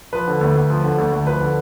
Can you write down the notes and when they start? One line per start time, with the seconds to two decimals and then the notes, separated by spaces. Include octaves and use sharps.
0.13 F3 B4
0.28 D3
0.41 D2
0.55 D2
0.70 F3
0.84 D3
0.98 D2
1.12 D2
1.27 F3 B4
1.42 D3